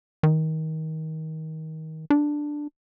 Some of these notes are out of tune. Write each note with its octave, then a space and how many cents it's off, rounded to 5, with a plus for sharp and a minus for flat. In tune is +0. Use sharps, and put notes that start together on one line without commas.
D#3 +25
D4 +5